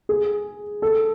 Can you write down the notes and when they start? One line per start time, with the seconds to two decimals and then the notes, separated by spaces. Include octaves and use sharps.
0.09 G#4
0.82 A4